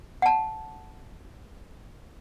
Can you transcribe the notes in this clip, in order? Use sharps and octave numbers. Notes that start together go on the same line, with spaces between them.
F#5 A5